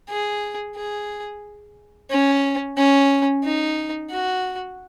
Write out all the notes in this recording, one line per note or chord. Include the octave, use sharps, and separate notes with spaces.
G#4
G#4
C#4
C#4
D#4
F#4